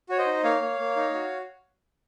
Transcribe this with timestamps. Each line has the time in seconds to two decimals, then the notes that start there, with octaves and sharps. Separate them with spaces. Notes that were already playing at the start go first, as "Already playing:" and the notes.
0.09 F#4 C#5
0.18 C5 D#5
0.26 D#4
0.44 A#3 C#5 F5
0.62 A#3
0.79 A#3
0.96 D#4
1.14 F#4